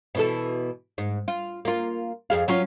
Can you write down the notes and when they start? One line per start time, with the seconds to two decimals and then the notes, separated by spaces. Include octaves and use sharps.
0.15 B2 E3 A4
0.98 G#2
1.28 F4
1.65 A#3 F4
2.30 F2 G#4 F5
2.48 F#3 C#4 F4